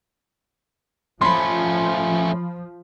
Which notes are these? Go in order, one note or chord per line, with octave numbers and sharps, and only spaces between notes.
F3 A3 C#4 B5 C6